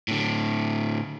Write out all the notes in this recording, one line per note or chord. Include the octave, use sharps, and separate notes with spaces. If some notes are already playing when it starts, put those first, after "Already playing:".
A2 D3